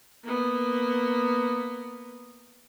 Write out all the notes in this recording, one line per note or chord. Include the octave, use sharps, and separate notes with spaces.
A#3 B3